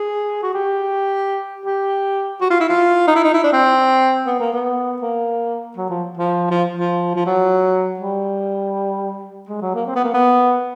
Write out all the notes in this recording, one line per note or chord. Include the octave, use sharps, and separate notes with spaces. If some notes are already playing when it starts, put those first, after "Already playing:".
Already playing: G#4
F#4
G4
G4
F#4
F4
E4
F4
D#4
E4
D#4
E4
D4
C4
B3
A#3
B3
A#3
F#3
F3
F3
F3
F3
F3
F#3
G3
G#3
F#3
A#3
C4
B3
A#3
B3